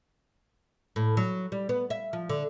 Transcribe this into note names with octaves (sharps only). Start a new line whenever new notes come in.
A2
F#3
G3
B3
E5
F3
D3